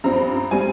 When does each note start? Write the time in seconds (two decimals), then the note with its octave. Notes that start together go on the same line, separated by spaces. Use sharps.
0.04 G2 F3 C4 A#5
0.51 G3 C4 G#5